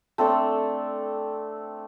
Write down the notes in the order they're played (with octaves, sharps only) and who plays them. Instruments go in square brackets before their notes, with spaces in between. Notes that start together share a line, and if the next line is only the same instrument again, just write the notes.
[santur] A3 C4 D4 A4